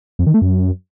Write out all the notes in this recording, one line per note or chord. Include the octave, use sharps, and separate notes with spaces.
F2
D#3
A3
F#2